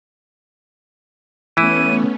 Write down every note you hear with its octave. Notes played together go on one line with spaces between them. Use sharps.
E3 A3 B3 C#4 E4 D#7